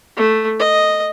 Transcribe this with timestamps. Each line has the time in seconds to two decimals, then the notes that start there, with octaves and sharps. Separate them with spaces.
0.17 A3
0.60 D#5